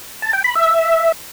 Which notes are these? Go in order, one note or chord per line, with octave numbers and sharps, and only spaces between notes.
A5
G5
B5
E5